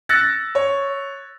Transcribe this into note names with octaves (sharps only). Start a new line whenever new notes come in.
E6 F#6 A6 A#6 C#7
C#5